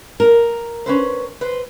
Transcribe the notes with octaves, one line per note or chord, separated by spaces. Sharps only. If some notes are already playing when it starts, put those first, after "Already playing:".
A#4
C#4 B4 C5
B4 C5